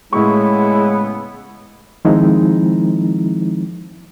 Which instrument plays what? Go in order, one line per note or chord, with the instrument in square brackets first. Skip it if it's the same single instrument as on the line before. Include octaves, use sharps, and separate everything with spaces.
[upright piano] A2 C#6 [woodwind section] C#3 B3 [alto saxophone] G#3 [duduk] E4
[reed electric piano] D#3 F3 G#3 C4 D#4 E4